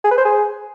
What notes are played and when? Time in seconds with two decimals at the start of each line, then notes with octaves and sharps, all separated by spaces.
0.04 G#4
0.11 B4
0.18 C5
0.25 G#4